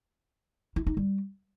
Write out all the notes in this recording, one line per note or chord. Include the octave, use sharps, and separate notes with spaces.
E4
D#4
G3